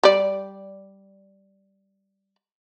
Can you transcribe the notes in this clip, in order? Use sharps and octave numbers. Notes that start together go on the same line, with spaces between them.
G3 D5